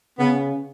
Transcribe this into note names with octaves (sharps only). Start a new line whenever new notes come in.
C#3 B3